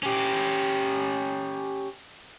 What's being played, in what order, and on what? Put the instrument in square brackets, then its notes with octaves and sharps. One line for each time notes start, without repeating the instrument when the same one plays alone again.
[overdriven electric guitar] C#4 G4